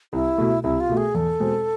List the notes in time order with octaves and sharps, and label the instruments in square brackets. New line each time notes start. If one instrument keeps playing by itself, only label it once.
[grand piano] C2 [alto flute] E4
[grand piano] B2 A3
[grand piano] C2 [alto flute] E4
[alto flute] F4
[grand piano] B2 A3
[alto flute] G#4
[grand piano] E2 [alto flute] A4
[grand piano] B2 G#3 C4